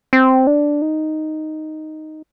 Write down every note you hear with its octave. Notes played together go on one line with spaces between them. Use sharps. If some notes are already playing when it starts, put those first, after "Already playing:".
C4
D4
D#4